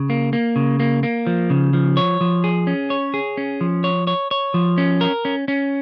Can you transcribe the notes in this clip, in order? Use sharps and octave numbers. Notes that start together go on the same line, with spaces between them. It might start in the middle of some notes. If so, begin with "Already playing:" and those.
Already playing: C#3
A#3
A#3
C#3
A#3
A#3
F3
C#3
F3
C#5
F3
G#4
C#4
C#5
G#4
C#4
F3
C#5
C#5
C#5
F3
C#4
A#4
C#4
C#4